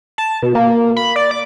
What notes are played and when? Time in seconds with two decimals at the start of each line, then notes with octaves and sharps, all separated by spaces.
0.18 A5
0.42 B2
0.55 A#3
0.97 B5
1.16 D5
1.31 D6